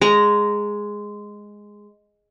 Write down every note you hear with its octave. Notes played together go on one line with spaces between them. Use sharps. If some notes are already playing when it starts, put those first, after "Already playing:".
G#3 A#5